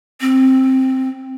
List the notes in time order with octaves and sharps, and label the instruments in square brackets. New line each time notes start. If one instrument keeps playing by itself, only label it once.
[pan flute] C4